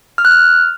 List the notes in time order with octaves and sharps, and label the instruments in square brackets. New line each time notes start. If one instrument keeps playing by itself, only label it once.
[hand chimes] F6
F#6
F6